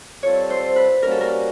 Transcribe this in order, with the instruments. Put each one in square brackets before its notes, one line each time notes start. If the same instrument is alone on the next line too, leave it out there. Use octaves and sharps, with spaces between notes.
[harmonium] G3 C4 F4 A4 [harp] C#5
[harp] C5
B4
[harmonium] G3 A#3 C#4 F#4 [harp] A#4
[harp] A4
A#4